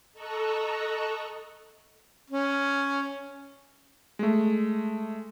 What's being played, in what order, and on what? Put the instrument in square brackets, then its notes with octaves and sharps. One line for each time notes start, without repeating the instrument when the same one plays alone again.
[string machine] A4 D#5 A#5 C#6 E6 F#6
[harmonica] C#4
[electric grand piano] G#3 A3